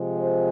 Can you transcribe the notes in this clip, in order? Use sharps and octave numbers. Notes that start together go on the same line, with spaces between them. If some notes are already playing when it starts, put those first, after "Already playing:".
Already playing: C3 F3 G#3
C5